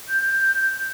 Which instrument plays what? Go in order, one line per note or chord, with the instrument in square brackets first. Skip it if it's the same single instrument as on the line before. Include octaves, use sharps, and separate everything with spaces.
[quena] G6